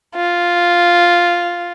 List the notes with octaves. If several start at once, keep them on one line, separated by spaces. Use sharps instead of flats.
F4